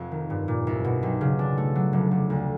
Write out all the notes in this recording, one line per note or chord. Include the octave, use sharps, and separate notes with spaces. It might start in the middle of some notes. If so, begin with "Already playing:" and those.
Already playing: F1 F2
D#3
G2
A#2
C2
B2
B1
C#3
D4
A3
F#3
F1
F1
D2